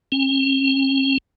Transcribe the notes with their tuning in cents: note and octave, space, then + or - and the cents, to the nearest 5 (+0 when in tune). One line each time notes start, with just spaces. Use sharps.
C#4 -45